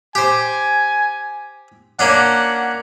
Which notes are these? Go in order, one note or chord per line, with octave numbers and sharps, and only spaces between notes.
G4 C5 G#5
A#3 C#4 D4 F#5